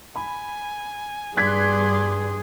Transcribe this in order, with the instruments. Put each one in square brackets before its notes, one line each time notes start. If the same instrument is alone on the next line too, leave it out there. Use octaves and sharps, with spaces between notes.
[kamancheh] G#5 [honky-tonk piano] B5
[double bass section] G2 [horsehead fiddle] G#4 [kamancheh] D5 C6 [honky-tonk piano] F#6 G#6 B6